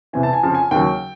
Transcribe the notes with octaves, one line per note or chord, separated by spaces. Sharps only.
E2 C3 E3 G#5
A5
G#5
F2 C#3 F3 A5
G#5
D#2 C#3 F#3 G5